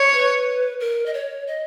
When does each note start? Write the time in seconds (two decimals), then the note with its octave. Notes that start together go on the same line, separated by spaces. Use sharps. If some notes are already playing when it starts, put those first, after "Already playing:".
Already playing: C#5
0.13 B4
0.80 A#4
1.06 D#5
1.14 C#5
1.47 D#5